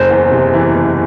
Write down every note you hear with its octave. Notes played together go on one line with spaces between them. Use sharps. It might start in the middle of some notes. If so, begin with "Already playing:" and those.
Already playing: F#1 C5
E2
C3
E3
F#1